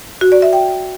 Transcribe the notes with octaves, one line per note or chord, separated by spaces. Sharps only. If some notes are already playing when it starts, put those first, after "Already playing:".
F#4
D5
E5
G5